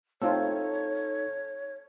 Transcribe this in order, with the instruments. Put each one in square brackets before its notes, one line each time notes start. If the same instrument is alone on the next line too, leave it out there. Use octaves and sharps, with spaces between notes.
[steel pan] A3 C4 F4 [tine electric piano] D#4 A4 [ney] C#5